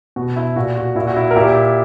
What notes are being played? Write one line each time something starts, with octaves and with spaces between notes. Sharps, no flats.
B2 F#4
E4
A#2 F#4
F#4
A#2 E4
F#4
E4
A#4
A#2 E4 G4